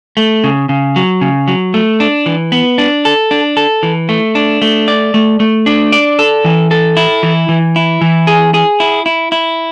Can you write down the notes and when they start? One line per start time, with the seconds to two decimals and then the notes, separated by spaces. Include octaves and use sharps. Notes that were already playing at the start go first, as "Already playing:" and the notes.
0.17 A3
0.44 C#3
0.69 C#3
0.96 F#3
1.21 C#3
1.48 F#3
1.74 A3
2.00 D4
2.26 E3
2.52 B3
2.78 D4
3.05 A4
3.31 D4
3.57 A4
3.83 E3
4.09 A3
4.35 D4
4.62 A3
4.88 D5
5.14 A3
5.40 A3
5.66 D4
5.92 D5
6.19 A4
6.45 E3
6.71 A4
6.97 E4
7.23 E3
7.49 E3
7.76 E4
8.01 E3
8.27 G#4
8.54 G#4
8.80 E4
9.06 E4
9.32 E4